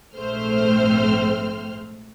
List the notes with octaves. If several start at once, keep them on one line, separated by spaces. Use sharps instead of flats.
A#1 G#2 A3 C4 C5 F6